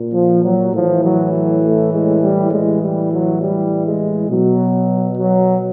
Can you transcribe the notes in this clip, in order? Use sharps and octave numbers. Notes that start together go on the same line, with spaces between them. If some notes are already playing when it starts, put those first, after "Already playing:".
Already playing: A#2
F3
F#3
A2 E3 F3
F#3
F#3
A3
G#3
G3
A2 E3 G#3
G3
F#3
G3
G#3
B2 F#3
F#3